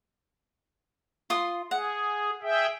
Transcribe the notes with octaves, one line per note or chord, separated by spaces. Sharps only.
F4 C6 D#6
G#4 F#5
G#4 E5 G5